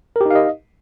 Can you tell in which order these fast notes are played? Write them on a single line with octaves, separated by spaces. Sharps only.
A#4 G4 D#4 F5 D#5